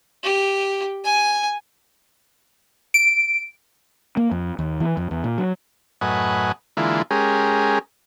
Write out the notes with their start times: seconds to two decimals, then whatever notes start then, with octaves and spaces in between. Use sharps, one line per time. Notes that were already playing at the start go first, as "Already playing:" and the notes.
0.23 G4
1.04 G#5
2.94 D7
4.17 A#3
4.31 F2
4.59 D#2
4.80 E3
4.97 F2
5.11 E2
5.24 A#2
5.38 F#3
6.01 F#2 A2 B4 D#5 F#5 G#5
6.77 D3 E3 G#3 A#3 E4 F4
7.11 G#3 C#4 G4 G#4 A#4